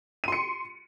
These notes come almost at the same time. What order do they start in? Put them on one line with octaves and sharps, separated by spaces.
D#7 C6 C#7